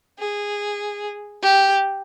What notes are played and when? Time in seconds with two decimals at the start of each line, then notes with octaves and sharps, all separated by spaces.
0.19 G#4
1.42 G4